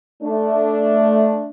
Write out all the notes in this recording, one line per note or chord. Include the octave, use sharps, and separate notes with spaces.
A3 D4